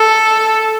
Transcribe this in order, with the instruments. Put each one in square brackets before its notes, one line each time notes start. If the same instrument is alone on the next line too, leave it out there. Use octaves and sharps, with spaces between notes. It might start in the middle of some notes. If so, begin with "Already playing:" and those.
Already playing: [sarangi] A4